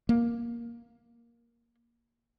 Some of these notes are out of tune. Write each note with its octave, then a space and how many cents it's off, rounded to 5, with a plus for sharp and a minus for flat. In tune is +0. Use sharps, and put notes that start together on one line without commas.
A#3 +10